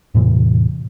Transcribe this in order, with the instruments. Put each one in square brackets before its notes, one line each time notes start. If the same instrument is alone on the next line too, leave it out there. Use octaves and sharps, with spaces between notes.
[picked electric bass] E2 A2 C3 E3